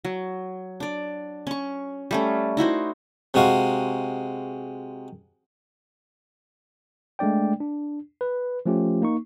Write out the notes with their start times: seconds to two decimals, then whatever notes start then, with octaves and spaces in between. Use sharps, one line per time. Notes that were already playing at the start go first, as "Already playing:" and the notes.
0.05 F#3
0.80 D4 D5
1.47 C#4 C#6
2.11 G3 A3 C#4
2.57 D#4 E4 F#4 C5
3.34 C3 G#3 F#4 F5
7.19 G#3 A3 D4 D5 G5
7.60 D4
8.21 B4
8.66 F3 A3 C#4 F4 G4
9.02 A#3 D#4 C#6